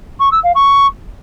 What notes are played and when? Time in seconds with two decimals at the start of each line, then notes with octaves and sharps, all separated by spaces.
0.19 C#6
0.31 E6
0.43 F5
0.55 C#6